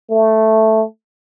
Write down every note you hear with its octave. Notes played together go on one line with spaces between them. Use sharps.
A3